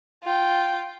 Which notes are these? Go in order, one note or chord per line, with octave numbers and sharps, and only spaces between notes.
F4 G5